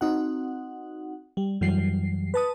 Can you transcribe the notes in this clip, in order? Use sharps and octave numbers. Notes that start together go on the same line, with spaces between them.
C4 D#4 F#4 F#5
G3
F#2 E3 F#3 G3 C7
B4 A5 D#6